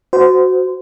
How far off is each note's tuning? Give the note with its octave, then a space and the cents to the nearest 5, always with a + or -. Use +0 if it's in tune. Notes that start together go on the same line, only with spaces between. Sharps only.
F#4 +0 C5 -25